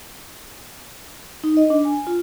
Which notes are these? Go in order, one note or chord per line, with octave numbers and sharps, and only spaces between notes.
D#4
D#5
D4
G#5
F4